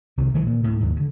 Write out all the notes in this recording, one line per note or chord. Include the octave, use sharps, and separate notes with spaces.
C2 C3 D#3
D#3 E3 F#3 G#3
A#2
D2 A2
D#2 G#2
D2 D3